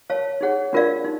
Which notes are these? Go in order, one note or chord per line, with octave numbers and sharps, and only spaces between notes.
A#4 C#5 F5 A5
D#4 G#4 C#5 F#5
D4 F4 A#4 D5 F5
D#4